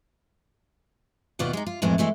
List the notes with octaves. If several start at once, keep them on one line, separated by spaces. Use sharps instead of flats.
D#2 B2 F4 B4 D5 F#5
G#3 D#4
F4
F2 A2 E3 G#3 B3
E3 G#3 A3 E4